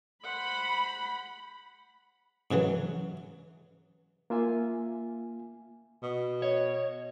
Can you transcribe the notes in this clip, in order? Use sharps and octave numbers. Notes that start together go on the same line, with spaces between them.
C5 F#5 B5
G#2 C#3 E3 F#3
A#3 F4 E5 G#5
B2
C#5 D#5